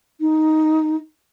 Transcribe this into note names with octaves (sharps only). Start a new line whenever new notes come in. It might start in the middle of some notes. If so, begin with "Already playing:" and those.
D#4